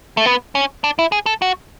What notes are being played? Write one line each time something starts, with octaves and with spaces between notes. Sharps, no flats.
A3
B3
C#4
D4
E4
G#4
A4
F#4